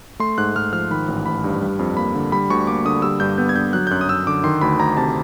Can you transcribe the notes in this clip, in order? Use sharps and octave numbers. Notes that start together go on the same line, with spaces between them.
A3 C6
G#2 F#6
G#2 F6
F3 F6
D#3 B5
A1
A1 B5
G2
G3
F2
A#3 B5
D3
G3 B5
D2 C#6
A#3 D6
D3 D#6
G3 E6
G2 G6
B3 G6
G#6
D3 G6
F#3 F#6
G6
F#2 F#6
D#6
F#2 E6
D3 D6
D#3 C6
D2 B5
D2 A#5
C3 A5